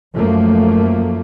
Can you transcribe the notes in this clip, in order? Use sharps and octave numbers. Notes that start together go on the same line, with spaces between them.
F#2 F3 A3 A#3